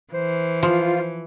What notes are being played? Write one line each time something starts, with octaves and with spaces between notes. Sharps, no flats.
E3 C5
F3 F4 C5